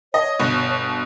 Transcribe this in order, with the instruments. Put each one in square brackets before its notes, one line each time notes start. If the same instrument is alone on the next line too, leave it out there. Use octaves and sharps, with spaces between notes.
[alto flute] C#5 [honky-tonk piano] D#5
[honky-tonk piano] G1 B2